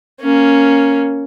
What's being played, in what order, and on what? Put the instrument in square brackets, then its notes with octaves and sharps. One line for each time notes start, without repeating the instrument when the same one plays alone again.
[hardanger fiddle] A#3 C#4